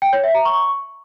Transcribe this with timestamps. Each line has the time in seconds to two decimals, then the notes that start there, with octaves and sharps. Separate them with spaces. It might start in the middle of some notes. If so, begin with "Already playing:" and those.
0.02 G5
0.13 C#5
0.24 E5
0.34 A#5
0.45 C#6